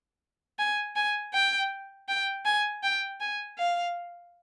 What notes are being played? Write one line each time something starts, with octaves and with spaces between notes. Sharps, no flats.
G#5
G#5
G5
G5
G#5
G5
G#5
F5